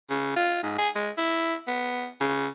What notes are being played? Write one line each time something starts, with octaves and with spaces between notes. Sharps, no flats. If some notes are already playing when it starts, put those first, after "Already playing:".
C#3
F4
G#2
G#4
G#3
E4
B3
C#3